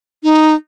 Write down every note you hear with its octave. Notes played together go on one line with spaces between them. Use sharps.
D#4